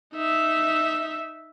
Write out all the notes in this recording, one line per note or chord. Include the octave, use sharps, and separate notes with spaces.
D#4 E5